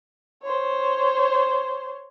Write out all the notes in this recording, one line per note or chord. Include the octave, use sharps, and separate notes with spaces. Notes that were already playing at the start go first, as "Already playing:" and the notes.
C5 C#5